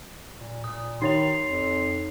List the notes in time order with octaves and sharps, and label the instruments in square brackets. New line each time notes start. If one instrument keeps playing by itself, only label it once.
[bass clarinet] A#2
[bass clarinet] A#2 [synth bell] D#6
[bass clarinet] D#3 [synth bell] D#4 C#5 F7 [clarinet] C6
[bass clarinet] F2